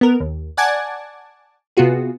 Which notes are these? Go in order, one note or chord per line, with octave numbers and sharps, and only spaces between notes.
B3 A#4
D#2
D5 F#5 G#5 A5 D6 G#6
C3 B3 F4 F#4 G#4